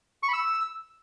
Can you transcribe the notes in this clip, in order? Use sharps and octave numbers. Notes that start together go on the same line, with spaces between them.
C#6
B5
E6